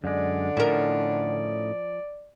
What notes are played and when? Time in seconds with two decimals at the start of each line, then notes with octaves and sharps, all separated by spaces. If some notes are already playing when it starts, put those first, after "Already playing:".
0.04 F#2 D3 G#3 D5
0.57 A2 F3 C#4 D#4 A#4